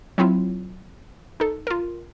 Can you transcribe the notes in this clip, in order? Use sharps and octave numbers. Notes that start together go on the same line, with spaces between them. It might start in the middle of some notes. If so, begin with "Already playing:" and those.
F#3 C4 E4 F4
D#4 A4
F4 A#4